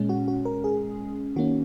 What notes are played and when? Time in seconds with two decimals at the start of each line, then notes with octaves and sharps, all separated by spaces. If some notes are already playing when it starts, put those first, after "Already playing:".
Already playing: A#2 G#3 C#4
0.09 F#4
0.28 F#4
0.45 A#4
0.64 G#4
1.36 D#3 A#3 C#4 F#4